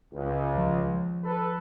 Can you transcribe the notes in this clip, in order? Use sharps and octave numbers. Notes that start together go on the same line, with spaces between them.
C#2
D#2 F3
A4 B4